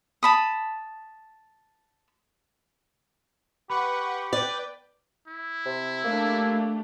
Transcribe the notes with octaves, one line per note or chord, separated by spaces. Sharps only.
A5 B5 D#6
G4 B4 F#5 B5 C#6
B4 D5 G5
E4
C3
A3 A#3 D4 G4